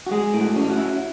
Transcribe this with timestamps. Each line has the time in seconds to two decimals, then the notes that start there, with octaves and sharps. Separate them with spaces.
0.07 F#4
0.11 G#3 G#4
0.34 A2
0.41 F#4
0.56 C#4
0.70 F#4
0.78 E4